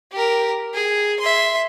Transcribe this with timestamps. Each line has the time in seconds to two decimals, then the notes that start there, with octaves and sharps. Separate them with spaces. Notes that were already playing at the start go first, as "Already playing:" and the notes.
0.12 G4 A#4
0.74 G#4
1.20 E5 C6